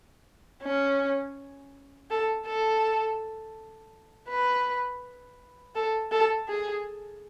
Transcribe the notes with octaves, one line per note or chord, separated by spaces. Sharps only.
C#4
A4
A4
B4
A4
A4
G#4